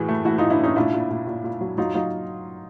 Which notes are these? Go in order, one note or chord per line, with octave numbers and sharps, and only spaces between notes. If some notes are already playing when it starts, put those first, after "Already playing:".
Already playing: A2 E3 F#4 G#4
A3
E3 E4 F#4
D#4 F4
A2
D4 E4
A2 C#4 D#4
A#2 D4 E4
A#2
A#2
A#2
A#2
F#3
F#3 D#4 F4
F#3 D#4 F4